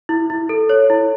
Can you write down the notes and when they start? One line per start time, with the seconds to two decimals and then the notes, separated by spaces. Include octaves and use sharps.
0.09 E4
0.30 E4
0.49 A4
0.69 C#5
0.90 E4